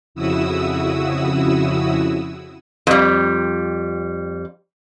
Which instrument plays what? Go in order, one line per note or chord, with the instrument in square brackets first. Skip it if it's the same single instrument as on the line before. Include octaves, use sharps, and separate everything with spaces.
[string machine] F2 C#3 E4 F#4 D#6 E6
[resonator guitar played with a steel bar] F2 G3